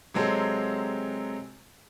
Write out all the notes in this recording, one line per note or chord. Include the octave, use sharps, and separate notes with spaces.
C3 F#3 G#3 C4 A4